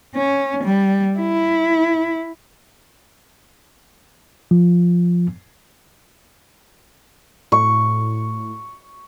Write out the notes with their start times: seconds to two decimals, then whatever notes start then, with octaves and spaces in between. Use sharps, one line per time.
0.15 C#4
0.64 G3
1.18 E4
4.51 F3
7.52 A2 C#6